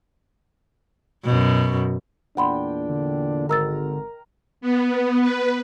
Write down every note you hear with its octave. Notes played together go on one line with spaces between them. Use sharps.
F#2 B2
E2 A#2 D4 F#5 G5 B5 C6
D3
G#1 A#4 D#5 E6 A6
B3
B4